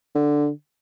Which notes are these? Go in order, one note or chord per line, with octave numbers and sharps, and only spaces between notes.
D3